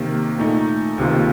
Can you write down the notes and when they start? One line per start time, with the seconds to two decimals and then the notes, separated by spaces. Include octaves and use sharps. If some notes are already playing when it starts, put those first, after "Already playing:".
Already playing: C3 D#3 A#3
0.38 A#2 A3 D#4
0.98 C#2 C3 D#3 A#3 F4